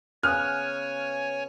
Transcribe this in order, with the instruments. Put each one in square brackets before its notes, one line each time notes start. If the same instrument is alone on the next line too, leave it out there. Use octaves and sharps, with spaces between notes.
[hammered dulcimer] C#3 B3 C#4 [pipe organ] C#5 G#5 [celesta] D#6 F#6 [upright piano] F6